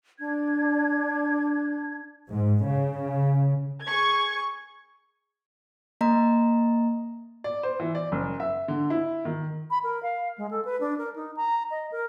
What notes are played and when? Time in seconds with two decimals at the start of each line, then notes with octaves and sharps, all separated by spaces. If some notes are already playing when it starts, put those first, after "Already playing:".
0.19 D4 G#6
2.33 G#2
2.68 C#3
3.84 G#4 C#6 G#6
6.01 A#3 D#5 A#5
7.44 D5
7.63 C5
7.80 E3
7.95 D5
8.12 F#1
8.40 E5
8.68 D3
8.90 E4
9.25 D#3
9.70 B5
9.83 A#4
10.03 F5
10.38 G#3
10.51 A4
10.65 B4
10.80 D4
10.98 A#4
11.15 D#4
11.36 A#5
11.70 D#5
11.92 A#4